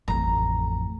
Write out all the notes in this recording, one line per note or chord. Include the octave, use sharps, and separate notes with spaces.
A1 F2 A#5